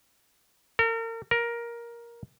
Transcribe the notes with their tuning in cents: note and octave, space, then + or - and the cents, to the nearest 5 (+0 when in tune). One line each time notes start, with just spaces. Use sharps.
A#4 -35
A#4 +15